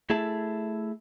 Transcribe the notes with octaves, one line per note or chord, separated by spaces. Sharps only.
A3 E4 G#4 A4 E5 A5